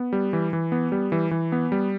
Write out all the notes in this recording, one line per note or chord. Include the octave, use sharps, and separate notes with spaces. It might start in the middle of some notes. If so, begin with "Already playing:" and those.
Already playing: B3
G3
E3
E3
B3
G3
E3
E3
B3
G3